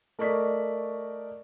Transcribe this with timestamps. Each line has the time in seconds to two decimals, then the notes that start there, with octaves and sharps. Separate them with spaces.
0.19 A3 A#4 D5 D#5 C#6 B6